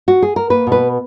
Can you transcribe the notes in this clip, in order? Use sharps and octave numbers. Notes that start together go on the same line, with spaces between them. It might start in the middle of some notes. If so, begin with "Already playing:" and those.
F#4
G#4
A#4
A#3 B4
B2
B4